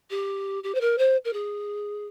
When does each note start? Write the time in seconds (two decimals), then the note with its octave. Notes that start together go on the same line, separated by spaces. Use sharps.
0.10 G4
0.63 G4
0.75 C5
0.81 A#4
0.98 C5
1.25 A#4
1.33 G#4